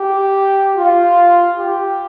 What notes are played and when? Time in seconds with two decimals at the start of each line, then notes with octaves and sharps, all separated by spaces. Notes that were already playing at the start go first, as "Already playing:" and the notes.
Already playing: G4
0.75 F4
1.57 G4